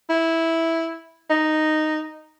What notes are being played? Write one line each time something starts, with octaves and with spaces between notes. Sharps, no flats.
E4
D#4